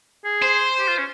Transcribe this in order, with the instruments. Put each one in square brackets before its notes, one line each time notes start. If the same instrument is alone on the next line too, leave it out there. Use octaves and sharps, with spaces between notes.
[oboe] G#4
[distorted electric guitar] C5
[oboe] G4
F4
C#4